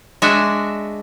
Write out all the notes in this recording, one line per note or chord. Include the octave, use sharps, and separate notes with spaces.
G#3 D4 F#4 E5 G#5